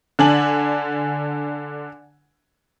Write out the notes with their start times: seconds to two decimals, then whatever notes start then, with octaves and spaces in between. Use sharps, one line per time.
0.19 D3 D4 G#5 F#7